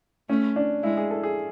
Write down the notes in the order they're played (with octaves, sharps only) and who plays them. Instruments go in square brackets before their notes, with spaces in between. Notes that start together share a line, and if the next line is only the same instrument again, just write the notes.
[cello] A3 [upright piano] C#4
[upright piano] D4
[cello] G#3 [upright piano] E4
[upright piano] G#4
A4
G#4